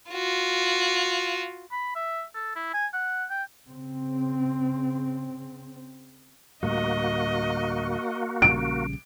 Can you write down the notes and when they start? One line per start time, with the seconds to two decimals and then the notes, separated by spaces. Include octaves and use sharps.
0.11 F4 F#4
1.72 B5
1.95 E5
2.35 A4
2.56 E4
2.74 G#5
2.93 F#5
3.30 G5
3.66 C#3 C4
6.63 D2 A2 G3 A#3 F#4 D#5
8.42 A#1 C#3 G3 D7